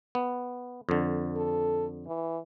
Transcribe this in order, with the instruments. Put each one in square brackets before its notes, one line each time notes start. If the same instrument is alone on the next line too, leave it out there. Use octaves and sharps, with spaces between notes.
[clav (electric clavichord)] B3
F2 D3
[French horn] A4
E3